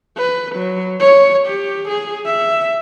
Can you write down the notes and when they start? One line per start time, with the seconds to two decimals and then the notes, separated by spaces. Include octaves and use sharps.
0.17 B4
0.56 F#3
1.00 C#5
1.47 G4
1.89 G#4
2.26 E5